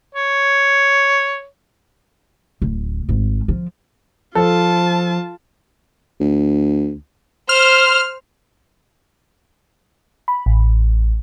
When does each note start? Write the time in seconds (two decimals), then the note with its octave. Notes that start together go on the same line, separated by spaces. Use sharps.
0.15 C#5
2.62 D1
3.09 G#1
3.48 F3
4.35 F3 F4 A4 A5
6.20 D2
7.49 C5 F6
10.28 B5
10.46 A1